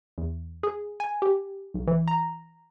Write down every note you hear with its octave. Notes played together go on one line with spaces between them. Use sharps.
E2
G#4
G#5
G4
B1
E3
A#5